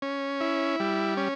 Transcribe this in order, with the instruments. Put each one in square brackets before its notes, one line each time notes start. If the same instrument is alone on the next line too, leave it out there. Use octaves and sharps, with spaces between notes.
[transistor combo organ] C#4
E4
G3
C#4